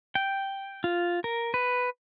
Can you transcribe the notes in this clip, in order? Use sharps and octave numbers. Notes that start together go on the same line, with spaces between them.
G5
F4
A#4
B4